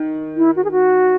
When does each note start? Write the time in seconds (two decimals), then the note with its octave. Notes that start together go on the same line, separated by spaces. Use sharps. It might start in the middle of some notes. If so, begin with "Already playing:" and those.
Already playing: D#3
0.37 E4
0.56 F#4
0.64 G#4
0.71 F#4